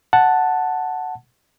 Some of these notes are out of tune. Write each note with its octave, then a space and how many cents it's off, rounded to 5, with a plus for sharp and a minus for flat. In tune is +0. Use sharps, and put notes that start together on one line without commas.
F#5 +0 A5 +0